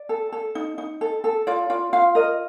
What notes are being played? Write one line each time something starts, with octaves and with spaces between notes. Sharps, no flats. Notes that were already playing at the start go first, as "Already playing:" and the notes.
Already playing: D5
A4
A4
D#4
D#4
A4
A4
F4 D5
F4 D5
F4 F5
A#4 D#5